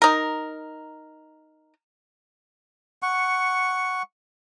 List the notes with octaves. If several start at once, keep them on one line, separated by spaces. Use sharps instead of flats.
D#4 A#4
F#5 C#6